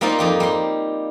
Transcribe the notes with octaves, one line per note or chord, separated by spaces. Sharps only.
G3 A#3 C4 D#4 F4
F2 D#4 G4
G3 C6